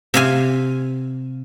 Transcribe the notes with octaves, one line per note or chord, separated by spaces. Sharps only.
C3 F5 G#5